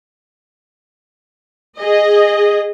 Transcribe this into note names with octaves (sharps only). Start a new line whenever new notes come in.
G#4 D#5